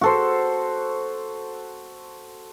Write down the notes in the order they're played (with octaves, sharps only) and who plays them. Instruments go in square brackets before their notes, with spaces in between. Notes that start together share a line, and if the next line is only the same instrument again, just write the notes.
[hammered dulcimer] F#4 A4 C5